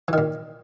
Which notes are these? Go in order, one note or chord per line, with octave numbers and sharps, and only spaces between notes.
A#2 D#3 E3